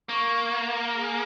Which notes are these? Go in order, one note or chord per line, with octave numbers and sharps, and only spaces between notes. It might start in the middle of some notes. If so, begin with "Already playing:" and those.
A#3 C#6
G#4